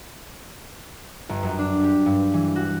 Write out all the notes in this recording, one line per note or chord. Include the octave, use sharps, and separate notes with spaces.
G1
F#2
D4
G4
G2
E3
F#4